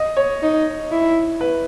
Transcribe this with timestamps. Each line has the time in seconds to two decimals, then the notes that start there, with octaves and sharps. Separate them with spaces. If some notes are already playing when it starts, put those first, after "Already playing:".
Already playing: D#5
0.17 C#5
0.42 D#4
0.91 E4
1.41 B4